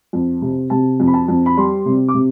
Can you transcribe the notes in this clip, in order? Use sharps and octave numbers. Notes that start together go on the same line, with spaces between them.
F2
C3
C3 A5
F2
B5
A5
F2
B5
G3 C6
C3
D6
C3